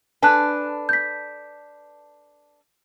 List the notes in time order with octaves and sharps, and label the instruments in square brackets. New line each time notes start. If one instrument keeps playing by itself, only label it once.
[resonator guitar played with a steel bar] D4 A4 B4 [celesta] G#5 A5 F#6
[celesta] G6 B6